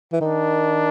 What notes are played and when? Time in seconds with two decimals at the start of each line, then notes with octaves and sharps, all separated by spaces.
0.12 E3
0.20 D#3 D4